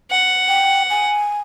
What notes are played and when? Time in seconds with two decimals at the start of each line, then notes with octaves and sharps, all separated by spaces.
0.11 F#5
0.48 G5
0.90 G#5